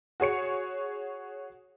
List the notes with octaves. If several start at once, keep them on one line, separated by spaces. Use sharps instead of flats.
F#4 G#4 C#5 C#7